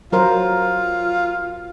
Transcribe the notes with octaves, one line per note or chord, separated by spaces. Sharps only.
F#3 F4 A#4 C5